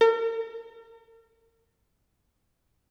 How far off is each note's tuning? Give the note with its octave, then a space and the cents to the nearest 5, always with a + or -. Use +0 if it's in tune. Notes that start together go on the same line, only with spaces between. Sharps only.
A#4 -40